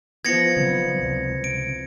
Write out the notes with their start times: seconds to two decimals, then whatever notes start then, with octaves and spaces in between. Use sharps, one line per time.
0.25 F3 B3 G#6 A#6 C#7
0.57 C#3 F#3 C4
0.99 C#2 C3
1.44 D7